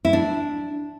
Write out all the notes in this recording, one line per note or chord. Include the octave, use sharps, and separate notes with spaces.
E4
D4